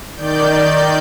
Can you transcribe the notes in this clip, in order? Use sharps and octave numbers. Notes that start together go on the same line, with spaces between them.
D#3 D5 G6